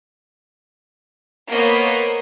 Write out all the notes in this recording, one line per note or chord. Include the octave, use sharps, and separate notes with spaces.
A#3 B3 A#4 C5 C#5 D#5